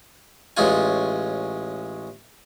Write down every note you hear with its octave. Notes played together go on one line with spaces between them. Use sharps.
A1 G#3 C#4 F4 G#5